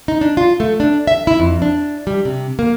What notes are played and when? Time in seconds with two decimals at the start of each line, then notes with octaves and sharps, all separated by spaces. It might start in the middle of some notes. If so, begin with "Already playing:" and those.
0.08 D#4
0.21 D4
0.37 F4
0.60 A3
0.80 D4
1.07 E5
1.27 E4
1.40 F2
1.62 D4
2.07 G3
2.25 C3
2.59 A#3